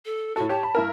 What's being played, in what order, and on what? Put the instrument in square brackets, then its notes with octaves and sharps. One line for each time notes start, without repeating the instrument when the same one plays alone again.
[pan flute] A4
[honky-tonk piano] A2 A4 [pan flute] F#4
[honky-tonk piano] G4 C#5 [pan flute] A5
[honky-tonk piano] B5
G2 E4 A#4